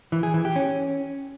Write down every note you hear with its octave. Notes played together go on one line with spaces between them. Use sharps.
E3
G#4
E3
G4
C#4